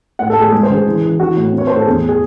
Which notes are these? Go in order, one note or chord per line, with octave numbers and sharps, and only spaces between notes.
A2 F#5
A4
A2
G#4
G#3 G#4
C5
C#3
G#4
E3
E3
E3 F#4
A2
C4
C#5
A2 C5
A4
E2 G#4
G#4